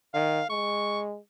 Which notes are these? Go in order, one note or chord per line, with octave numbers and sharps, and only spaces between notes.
D#3 F5
G#3 C#6